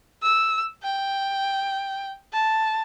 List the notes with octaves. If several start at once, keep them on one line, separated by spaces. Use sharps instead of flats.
E6
G5
A5